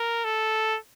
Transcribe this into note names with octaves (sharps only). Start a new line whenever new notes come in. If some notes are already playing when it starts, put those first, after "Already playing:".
Already playing: A#4
A4